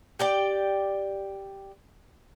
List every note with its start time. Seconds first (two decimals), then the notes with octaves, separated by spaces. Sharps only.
0.19 G4 D5 G5